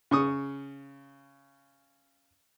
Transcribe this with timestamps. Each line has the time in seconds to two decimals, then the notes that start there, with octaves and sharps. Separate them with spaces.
0.11 C#3 C#6 D#6